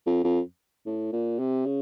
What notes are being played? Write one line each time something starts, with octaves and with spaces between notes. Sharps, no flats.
F2
F2
A2
A#2
C3
C#3